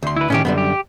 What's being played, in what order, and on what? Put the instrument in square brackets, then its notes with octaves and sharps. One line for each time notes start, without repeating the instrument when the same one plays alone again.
[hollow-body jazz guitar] D2 C6
[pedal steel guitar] E4 B4
[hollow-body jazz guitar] A2 C3 D#3 [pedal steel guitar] C#4 G4
[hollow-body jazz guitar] F#2 D3 G3 [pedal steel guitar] B3
[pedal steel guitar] G4